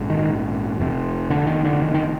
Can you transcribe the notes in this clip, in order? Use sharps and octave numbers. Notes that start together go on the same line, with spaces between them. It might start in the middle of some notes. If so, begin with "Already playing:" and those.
Already playing: A#1 G#2
D#3
F1 F2 C3
D3
D#3
D3
D#3
D#3